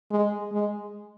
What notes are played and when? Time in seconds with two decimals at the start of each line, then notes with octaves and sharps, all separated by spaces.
0.11 G#3
0.52 G#3